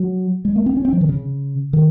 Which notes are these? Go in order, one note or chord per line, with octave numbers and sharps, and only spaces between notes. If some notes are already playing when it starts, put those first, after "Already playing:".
Already playing: F#3
G#3
A#3
C4
C#4
C4
F3
D#3
C#3
D#3